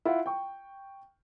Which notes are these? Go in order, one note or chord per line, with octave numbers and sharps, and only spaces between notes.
E4 F4 F#5
G5 C#6